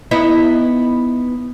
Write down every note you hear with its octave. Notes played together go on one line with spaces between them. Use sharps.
B3 D#4 E4